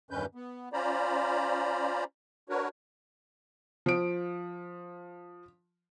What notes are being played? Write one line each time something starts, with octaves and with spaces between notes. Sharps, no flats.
E2 G2 D#3 C#4 B4 G6
B3
C#4 F4 C5 D5 A#5 B5
D4 F#4 A#4 B4 C#5
F3 D7